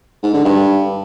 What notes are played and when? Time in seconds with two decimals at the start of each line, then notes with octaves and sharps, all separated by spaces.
0.23 G#2
0.34 D3
0.45 G2